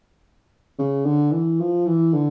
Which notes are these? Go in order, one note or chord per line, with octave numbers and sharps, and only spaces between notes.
C#3
D3
E3
F3
E3
D3